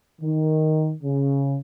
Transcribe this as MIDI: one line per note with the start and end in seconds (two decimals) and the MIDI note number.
0.22 0.93 51
1.03 1.57 49